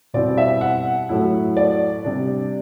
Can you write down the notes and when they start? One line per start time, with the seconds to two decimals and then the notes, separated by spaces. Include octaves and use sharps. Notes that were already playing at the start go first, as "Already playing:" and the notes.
0.14 B2 G3 C4 E4 D5
0.38 E5
0.61 F#5
1.09 A2 F#3 A3 E4
1.57 D5
2.04 C3 G3 D4